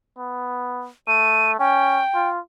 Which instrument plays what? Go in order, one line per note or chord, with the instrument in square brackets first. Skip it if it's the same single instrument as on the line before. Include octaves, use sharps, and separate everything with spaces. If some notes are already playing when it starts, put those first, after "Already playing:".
[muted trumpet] B3
[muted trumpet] A3 [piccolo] D#7
[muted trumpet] C#4 [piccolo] G5
[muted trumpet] F4